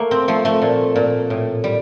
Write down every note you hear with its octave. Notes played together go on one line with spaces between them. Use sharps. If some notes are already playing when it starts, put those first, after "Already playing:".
Already playing: A3 A#3
C4
F3 A3
A3
A#2
A#2
A2
G3